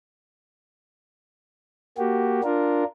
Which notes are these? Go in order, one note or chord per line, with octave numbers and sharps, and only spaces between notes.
A#3 F#4 G4
D4 F4 A#4